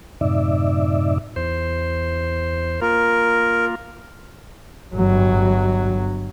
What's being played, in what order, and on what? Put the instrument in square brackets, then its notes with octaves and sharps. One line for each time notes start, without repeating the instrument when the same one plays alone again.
[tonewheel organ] F#2 A2 C3 D#4 D5 E5
E2 C5
[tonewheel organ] A#3 F4 [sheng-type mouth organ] A#4
[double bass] G1 F#3